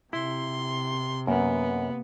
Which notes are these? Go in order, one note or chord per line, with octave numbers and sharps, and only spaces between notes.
C3 E4 C6
F#2 A#3 B3